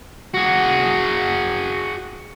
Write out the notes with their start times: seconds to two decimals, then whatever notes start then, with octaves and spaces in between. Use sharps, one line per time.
0.34 F#4 G#4